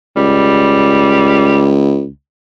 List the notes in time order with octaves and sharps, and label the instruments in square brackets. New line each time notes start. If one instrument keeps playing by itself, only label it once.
[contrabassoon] C#2 [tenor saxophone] G3